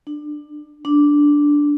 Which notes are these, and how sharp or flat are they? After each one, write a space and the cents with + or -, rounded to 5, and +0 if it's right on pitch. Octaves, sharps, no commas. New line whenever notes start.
D4 +20
D4 -5